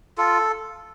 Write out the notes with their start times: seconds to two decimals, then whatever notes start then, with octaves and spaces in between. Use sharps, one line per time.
0.18 F4 A4